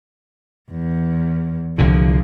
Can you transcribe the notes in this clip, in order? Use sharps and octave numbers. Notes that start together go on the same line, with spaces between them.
E2
C2 A#2 D3 F3